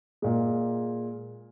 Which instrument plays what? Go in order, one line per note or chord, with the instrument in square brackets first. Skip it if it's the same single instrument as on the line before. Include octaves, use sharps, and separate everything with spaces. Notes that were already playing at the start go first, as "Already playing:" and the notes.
[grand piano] A#2 G#3